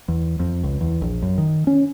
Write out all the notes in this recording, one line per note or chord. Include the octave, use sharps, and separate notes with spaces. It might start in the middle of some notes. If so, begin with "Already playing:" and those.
E2
F2
C#2
E2
A#1
F#2
D#3
C#4